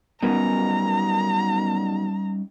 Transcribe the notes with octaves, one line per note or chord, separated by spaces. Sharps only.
F#2 B2 D#3 G3 B3 C#4 D#4 A#5